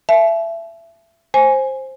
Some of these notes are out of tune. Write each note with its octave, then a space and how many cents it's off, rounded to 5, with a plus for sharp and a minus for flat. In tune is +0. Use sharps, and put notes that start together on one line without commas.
E5 +25 A5 -45
C5 +15 G#5 +0